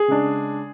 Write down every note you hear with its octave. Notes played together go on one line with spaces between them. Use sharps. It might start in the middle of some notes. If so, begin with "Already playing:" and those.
Already playing: G#4
C#3 G#3 D4